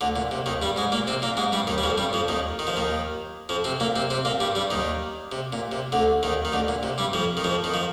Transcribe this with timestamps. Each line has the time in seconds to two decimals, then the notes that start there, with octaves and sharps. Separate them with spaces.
0.01 D2 D3
0.16 A#2
0.31 C3
0.46 D#2 D#3
0.62 G2 G3
0.76 G#2 G#3
0.92 A#2 A#3
1.07 C3 C4
1.22 A#2 A#3
1.37 G#2 G#3
1.52 G2 G3
1.67 D#2 D#3
1.78 G3
1.83 F2 F3
1.98 G2 G3
2.13 F2 F3
2.28 D#2 D#3
2.59 D#3
2.67 F3
2.76 D#2 D#3
3.49 F2 F3
3.64 C3 C4
3.80 A#2 A#3
3.96 C3 C4
4.10 C3 C4
4.25 A#2 A#3
4.40 G2 G3
4.55 G2 G3
4.71 D#2 D#3
5.32 C3
5.53 A#2
5.72 C3
5.92 D2 D3
6.23 D#2 D#3
6.45 D#3
6.52 D2 D3
6.68 A#2
6.83 C3
6.98 G2 G3
7.13 F2 F3
7.37 D#3
7.44 F2 F3
7.64 D#3
7.74 F3